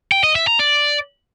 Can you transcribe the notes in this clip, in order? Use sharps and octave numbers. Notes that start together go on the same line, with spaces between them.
G5
D#5
E5
A#5
D5